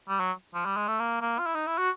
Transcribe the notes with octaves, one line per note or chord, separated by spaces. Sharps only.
G3
F#3
F3
G3
G#3
A3
A#3
A#3
F4
E4
D#4
E4
F#4